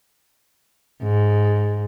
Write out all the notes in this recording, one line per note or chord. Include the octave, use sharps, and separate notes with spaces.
G#2